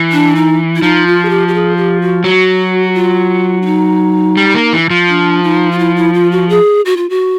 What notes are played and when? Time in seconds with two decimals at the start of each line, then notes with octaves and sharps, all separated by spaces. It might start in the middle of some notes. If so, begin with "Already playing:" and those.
Already playing: E3
0.12 D4
0.36 D#4
0.76 E4
0.82 F3 D#4
1.07 F4
1.25 G#4
1.30 G4
1.48 G4
1.54 G#4
1.77 G4
2.02 F#4
2.24 F#3 F#4
2.95 F4
3.62 D4
3.66 D#4
4.37 G3
4.54 A#3
4.73 E3
4.90 F3
5.08 D4
5.43 D#4
5.71 F4
5.79 E4
5.96 E4
6.14 F4
6.32 F#4
6.49 G#4
6.86 F#4
6.97 F4
7.10 F#4